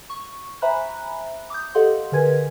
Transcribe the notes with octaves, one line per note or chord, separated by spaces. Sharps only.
C#6
C5 E5 G#5 A#5 B5 F#6
D6 D#6 G6
G4 A4 D#5 F5 F#5 C6
D3 G#4 A#4 B4 G#5 G#6